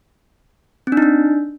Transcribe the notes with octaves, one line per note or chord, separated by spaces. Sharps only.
C4
D4
D#4
D4